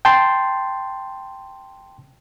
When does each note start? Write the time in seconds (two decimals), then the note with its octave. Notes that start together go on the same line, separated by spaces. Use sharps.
0.05 G5 A5 C6